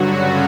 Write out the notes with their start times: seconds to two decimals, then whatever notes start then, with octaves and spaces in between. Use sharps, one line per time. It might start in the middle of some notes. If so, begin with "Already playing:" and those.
Already playing: G2 D3 F#3 F#4
0.13 C#3 C#4